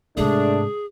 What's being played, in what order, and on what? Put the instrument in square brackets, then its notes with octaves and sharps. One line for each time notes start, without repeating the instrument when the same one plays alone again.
[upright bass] G#2 C3 [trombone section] A3 D4 [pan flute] G#4